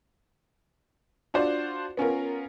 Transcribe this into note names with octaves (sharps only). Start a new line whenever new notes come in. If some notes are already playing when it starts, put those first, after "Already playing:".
D4 F4 F#4 C5 D5
B3 C#4 F4 A#4